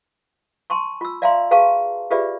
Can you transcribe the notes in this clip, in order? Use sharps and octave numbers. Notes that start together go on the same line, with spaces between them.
G#5 A5 C6 C#6
F4 E6
D5 E5 F5 G#5 A#5 C6
F#4 G#4 B4 F5 A5 C#6
F4 G4 G#4 B4 D5 E5